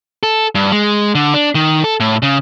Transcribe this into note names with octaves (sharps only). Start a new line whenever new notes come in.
A4
G2
G#3
D3
D4
D#3
A4
A2
C#3